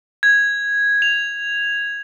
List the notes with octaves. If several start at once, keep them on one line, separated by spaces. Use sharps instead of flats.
G#6
F7